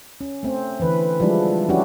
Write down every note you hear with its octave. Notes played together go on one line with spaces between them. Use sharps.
C#4
A3 C4
D3 E3 B4
F3 G3 G#3 D4 E4
F3 C#4 D4 E4 F#4 G4